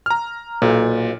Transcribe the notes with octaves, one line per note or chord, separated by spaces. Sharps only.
A#5 F6
B1 A#2